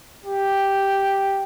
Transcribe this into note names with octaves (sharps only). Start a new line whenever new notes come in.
G4